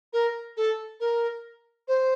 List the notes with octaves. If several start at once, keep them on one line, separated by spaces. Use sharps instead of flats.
A#4
A4
A#4
C5